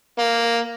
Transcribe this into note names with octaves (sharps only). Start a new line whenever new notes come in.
A#3